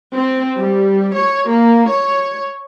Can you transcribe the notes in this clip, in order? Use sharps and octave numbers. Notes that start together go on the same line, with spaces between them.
C4
G3
C#5
A#3
C#5